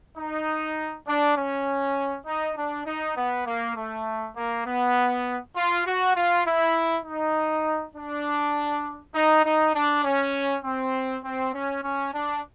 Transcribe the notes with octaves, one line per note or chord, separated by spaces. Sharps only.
D#4
D4
C#4
D#4
D4
D#4
B3
A#3
A3
A#3
B3
F4
F#4
F4
E4
D#4
D4
D#4
D#4
D4
C#4
C4
C4
C#4
C#4
D4